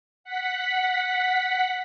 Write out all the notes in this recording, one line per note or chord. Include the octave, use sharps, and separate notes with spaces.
F#5 B6